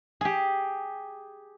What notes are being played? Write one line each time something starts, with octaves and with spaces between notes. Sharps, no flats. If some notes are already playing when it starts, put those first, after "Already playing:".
G4 G#4